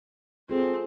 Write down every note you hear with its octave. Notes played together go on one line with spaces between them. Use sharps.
C4 F4 G#4 A4